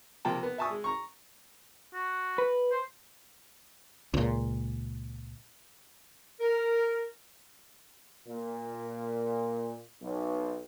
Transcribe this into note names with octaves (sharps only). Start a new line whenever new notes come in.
C3 F3 A#3 G5 A5
B3
E5 G#5 A5 C#6 D#6 E6
G#3
A#5 C#6
F#4
B4
C5
C#2 A#2
A#4
A#2
B1